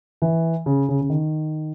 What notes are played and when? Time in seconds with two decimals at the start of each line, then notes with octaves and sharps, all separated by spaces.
0.22 E3
0.66 C#3
0.89 C#3
1.01 C#3
1.10 D#3